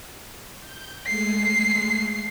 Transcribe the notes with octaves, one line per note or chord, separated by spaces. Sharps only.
G6
G#3 A3 C7